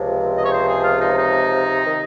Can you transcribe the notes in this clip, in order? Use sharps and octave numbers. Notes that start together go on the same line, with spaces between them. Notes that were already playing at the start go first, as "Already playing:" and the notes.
Already playing: C#2 C3 F3
D#5
C#5
C5
G#4
F4
D#4
D#4
D#3